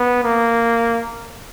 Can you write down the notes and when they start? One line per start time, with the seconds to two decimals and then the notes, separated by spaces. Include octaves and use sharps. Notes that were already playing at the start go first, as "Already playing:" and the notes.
Already playing: B3
0.24 A#3